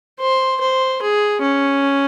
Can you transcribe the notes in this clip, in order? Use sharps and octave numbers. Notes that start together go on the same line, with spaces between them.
C5
C5
G#4
C#4